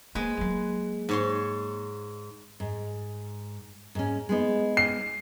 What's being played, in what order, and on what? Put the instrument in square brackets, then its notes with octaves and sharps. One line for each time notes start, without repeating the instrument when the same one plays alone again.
[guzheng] G#3 G#4 B4 [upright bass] A#3
[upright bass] F#3 A#3
[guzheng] G#2 C#5 C6
[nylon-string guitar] G#2
G#2 C#4
G#3 B3 D#4
[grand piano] C7